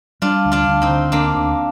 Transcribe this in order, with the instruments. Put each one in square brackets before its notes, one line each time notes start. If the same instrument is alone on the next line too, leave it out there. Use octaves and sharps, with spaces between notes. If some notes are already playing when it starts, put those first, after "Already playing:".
[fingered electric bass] G3 [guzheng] D4 F4
[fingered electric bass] D2
[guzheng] D4 F4
[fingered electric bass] D2
[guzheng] C4 D#4
[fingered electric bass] D3
[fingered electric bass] D2 [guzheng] A#3 D4
[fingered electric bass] D2